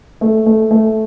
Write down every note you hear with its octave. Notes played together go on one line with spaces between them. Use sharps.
A3
A3
A3